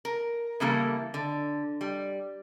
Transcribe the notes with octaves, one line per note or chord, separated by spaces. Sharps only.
A#4
C#3 E3 G3 A#3 E4 A4
D3
G3